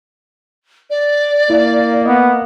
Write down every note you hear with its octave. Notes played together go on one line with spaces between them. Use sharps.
D5
A#3 E4
B3 D#5